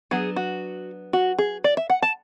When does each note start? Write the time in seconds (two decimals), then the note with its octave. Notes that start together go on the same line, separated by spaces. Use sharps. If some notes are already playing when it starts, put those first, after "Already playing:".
0.11 F#3 B3 D4 G#4
0.36 F#4
1.13 F#4
1.38 G#4
1.64 D5
1.77 E5
1.90 F#5
2.02 A5